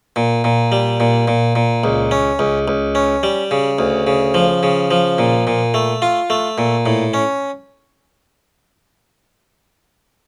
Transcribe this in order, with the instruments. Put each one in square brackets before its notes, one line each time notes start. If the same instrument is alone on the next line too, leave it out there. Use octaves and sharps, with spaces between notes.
[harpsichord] A#2
A#2
G3
A#2
A#2
A#2
C#2
C#4
C#2
C#2
C#4
G3
C#3
D2
C#3
F3
C#3
F3
A#2
A#2
A3
F4
A3
A#2
A2
C#4